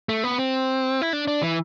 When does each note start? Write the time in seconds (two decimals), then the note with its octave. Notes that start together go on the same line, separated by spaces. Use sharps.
0.09 A3
0.24 B3
0.39 C4
1.02 E4
1.13 D4
1.28 D4
1.42 E3